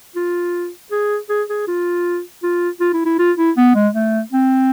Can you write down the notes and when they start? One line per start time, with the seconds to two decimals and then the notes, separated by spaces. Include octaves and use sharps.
0.16 F4
0.92 G#4
1.30 G#4
1.49 G#4
1.67 F4
2.43 F4
2.81 F4
2.93 E4
3.06 E4
3.19 F4
3.38 E4
3.57 B3
3.75 G#3
3.94 A3
4.32 C4